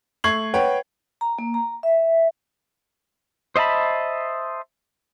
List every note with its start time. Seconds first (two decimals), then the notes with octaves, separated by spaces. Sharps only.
0.24 A3 C#6 G#6 C7 F#7
0.54 B4 C#5 F#5 G5
1.21 A#5
1.39 A#3
1.54 A#5
1.83 E5
3.56 C5 D#5 E5 A5 B5